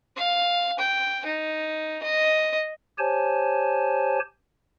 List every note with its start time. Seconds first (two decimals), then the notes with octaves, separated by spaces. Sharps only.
0.17 F5
0.79 G5
1.26 D#4
2.03 D#5
2.98 G4 C5 C#5 G#5 A5